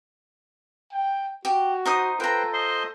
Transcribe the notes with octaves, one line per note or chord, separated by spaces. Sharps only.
G5
F#4 G4
D#4 C5 D#6
F4 A4 B4 C5 G5 A#5
C5 D#5 C6